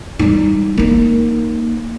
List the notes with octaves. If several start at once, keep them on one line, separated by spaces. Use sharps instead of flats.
G3 D#4
A#3 D#4